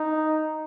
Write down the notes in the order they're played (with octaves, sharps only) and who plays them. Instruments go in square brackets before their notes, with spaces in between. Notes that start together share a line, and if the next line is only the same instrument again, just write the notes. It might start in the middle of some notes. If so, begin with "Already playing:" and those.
Already playing: [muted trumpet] D#4